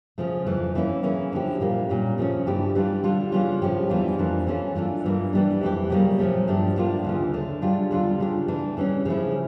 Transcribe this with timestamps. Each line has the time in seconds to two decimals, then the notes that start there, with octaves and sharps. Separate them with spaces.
0.18 C#3 F3 A3
0.46 F2 E3 A3
0.75 E3 A#3 C#4 E4
1.03 C#3 E3 A#3 C#4 E4
1.32 D3 F3 C#4 E4 G4
1.60 A#2 G3 A#3
1.89 A#2 G3 C#4
2.18 C#3 F3 A3 C#4
2.46 G2 E3 A3 E4 G4
2.75 E3 G3 D4 F4
3.04 D3 G3 D4 F4
3.32 C#3 E3 G3 C#4 F4
3.62 A2 F3 A3 C#4 G4
3.89 E2 E3 G3 D4 F4
4.18 F2 E3 G3 A#3 D4
4.47 E3 A3 C#4 F4
4.75 E3 A3 D4 F4
5.04 G2 E3 G3 A#3
5.33 E3 G3 D4
5.61 F2 E3 A3 E4 G4
5.90 C#3 E3 G3 A#3
6.19 A#2 F3 A3 C#4
6.47 G2 F3 A3 D4 G4
6.76 A2 G3 A#3 D4 F4
7.05 D2 C#3 E3
7.33 D3 A3 C#4
7.62 C#3 G3 D4 F4
7.91 E2 D3 G3 D4 F4
8.20 C#3 G3 D4
8.48 E3 A3 D4
8.77 C#3 E3 G3 C#4
9.05 C#3 F3 A3 E4